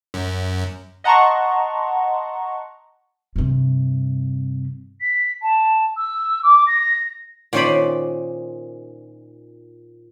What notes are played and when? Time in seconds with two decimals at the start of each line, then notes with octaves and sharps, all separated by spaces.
0.14 F#2
1.04 D#5 F#5 A5 A#5 C6 C#6
3.36 G2 C3
5.01 B6
5.42 A5
5.97 E6
6.43 D6
6.67 A#6
7.53 A#2 D#3 C#4 C5 D5 B5